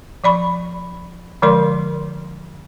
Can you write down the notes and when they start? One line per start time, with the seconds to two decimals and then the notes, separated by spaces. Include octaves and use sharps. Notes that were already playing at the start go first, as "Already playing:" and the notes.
0.24 F3 D5 B5 C#6
1.42 D3 F3 G#3 A#4 D5 C6